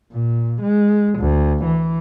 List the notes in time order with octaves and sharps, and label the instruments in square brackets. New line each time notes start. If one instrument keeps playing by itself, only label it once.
[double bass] A#2
G#3
D2
E3